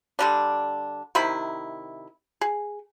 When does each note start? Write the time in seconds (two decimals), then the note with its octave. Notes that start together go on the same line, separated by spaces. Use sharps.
0.19 D3 G3 D4
1.15 C3 D#3 E4 B5
2.41 G#4